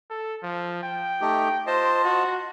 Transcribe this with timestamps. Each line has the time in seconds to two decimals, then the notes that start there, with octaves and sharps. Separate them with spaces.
0.10 A4
0.42 F3
0.83 G5
1.21 A3 D#4 G4
1.67 F4 C5 D#5 A5
2.04 F#4